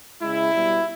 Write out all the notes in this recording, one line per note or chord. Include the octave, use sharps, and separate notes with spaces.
C#3 G#3 E4
B2 G3